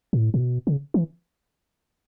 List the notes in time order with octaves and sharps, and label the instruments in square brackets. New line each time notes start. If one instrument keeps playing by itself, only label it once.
[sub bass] A2
A2
B2
C#3
E3